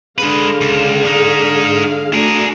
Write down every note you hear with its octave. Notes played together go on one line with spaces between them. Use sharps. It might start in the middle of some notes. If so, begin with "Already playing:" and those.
D3 G#3 G#4 B4 F5
C#2
G#3 D#4
A3 D4 F#4 G#4 A#4